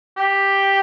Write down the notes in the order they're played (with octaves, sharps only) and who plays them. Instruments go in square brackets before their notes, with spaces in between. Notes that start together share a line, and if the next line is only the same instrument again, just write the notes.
[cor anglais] G4